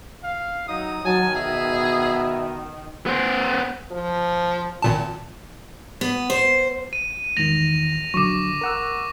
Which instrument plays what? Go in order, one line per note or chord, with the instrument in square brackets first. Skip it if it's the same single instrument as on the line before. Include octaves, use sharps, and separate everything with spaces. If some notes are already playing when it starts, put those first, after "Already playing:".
[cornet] F5
[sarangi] F#3 [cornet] D#4 [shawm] D#6
[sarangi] D#3 [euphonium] F#3 [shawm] G#5 [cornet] A5
[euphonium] B2 [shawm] G#4 [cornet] E5
[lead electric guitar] B3 C5
[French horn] F3
[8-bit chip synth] G#1 A#2 A5
[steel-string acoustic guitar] B3
C5
[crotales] D#7
[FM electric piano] E2 G#2 D#3 [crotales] A#6 F7
[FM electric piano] A#1 D3 F#3 [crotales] C#6 D6
[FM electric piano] A#4 F#5 E6